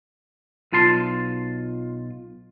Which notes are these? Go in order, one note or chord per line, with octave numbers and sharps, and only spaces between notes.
B1 F4 A5 C6